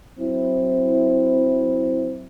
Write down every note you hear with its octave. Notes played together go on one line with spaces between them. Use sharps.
F#3 C4 E4